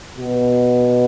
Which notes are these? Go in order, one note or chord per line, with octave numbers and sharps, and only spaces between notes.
B2